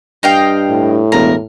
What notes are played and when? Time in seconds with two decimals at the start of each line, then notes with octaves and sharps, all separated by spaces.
0.23 G2 D#5 F5 G5
0.69 A2
1.12 E1 A#4